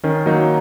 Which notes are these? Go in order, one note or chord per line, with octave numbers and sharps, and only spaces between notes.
D#3 C#4
F#3 A#3 D#4